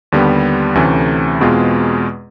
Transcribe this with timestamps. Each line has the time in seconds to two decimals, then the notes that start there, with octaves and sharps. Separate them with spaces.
0.12 D#2 D3 G3 B3
0.75 D2 C3 E3 A3 C#4
1.41 E2 B2 G#3 C4 F4